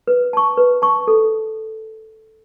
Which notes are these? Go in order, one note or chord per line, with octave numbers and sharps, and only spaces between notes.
B4
A5 C#6
B4
A5 C#6
A4